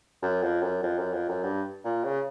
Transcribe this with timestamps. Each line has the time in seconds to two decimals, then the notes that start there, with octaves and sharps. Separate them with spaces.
0.22 F#2
0.43 F2
0.62 F#2
0.83 F2
0.98 F#2
1.13 F2
1.29 F#2
1.44 G2
1.84 A#2
2.04 C#3